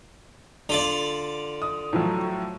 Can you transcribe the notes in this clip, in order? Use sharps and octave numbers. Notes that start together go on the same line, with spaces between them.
D3 F4 D5
D#6
A2 F3 F#3